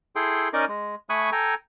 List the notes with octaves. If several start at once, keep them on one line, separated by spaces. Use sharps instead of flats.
E4 G#4 A4 G5 C6
C#4 D#4 A#4 D5 D#5
G#3
A3 G#5 B5 C#6 D#6 F#6
A4 G5 G#5 A#5